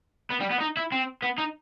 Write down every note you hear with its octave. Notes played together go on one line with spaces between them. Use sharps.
B3
G3
B3
D#4
E4
C4
B3
D#4